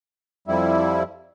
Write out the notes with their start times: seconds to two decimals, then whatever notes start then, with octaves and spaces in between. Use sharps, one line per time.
0.48 F2 G3 E4